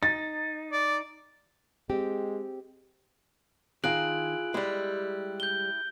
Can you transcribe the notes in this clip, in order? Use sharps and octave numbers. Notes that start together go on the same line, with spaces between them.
D#4 A6
D5
G#3 C4 G4
D#3 E4 F4 G#4 F#6 D7 F#7
G3 G#3 E4 G4
G6 G7